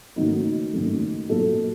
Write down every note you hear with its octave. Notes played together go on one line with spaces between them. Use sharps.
F#1 F#2 D#3 F#3 A3 D#4
F#1 F#2 D#3 F#3 A3
B1 A#2 F#3 A4